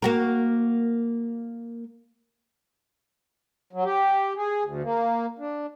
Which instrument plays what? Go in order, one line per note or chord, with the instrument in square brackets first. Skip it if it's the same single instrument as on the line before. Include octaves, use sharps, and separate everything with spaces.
[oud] A#3 F#4 A#4
[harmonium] F#3
G4
G#4
D2
A#3
D4